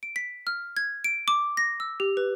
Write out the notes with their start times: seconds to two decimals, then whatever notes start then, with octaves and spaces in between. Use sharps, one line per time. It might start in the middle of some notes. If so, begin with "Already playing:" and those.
0.03 D7
0.16 B6
0.47 F6
0.77 G#6
1.04 D7
1.28 D6
1.57 A#6
1.80 E6
2.00 G4
2.17 B4